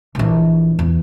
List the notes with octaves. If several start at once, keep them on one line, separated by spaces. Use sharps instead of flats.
A#1 E3
E2